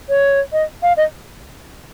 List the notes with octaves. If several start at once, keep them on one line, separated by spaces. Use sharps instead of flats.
C#5
D#5
F5
D#5